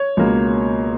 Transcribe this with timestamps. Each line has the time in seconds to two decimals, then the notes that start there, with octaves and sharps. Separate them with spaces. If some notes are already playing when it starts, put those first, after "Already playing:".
Already playing: C#5
0.17 C#2 B2 A#3